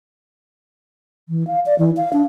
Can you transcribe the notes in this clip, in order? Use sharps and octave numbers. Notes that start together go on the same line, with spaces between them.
E3
F5
D5
E3
F5
D4